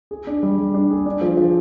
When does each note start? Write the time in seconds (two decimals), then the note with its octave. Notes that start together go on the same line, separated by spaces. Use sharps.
0.11 G#4
0.27 D4
0.43 G3
0.59 G3
0.74 D4
0.91 G#4
1.06 D4
1.21 F3
1.37 F3